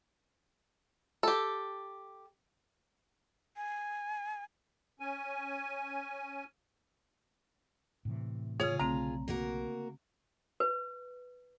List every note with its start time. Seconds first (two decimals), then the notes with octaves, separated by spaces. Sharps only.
1.23 G4 A4
3.57 G#5
5.00 C#4 G#5
8.05 A2 C3 E3
8.60 C#3 F4 G#4 C#5 D#6
8.79 B1 D3 A3 C4 A#5
9.28 A#3 F#4 A#4
10.60 B4